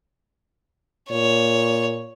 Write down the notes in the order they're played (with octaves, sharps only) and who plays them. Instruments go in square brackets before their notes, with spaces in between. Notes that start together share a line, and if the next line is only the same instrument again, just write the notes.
[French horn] A#2 [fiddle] C#5